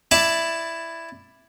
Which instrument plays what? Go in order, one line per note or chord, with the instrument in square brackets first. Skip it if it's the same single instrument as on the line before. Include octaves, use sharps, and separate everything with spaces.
[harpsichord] E4 D5 A5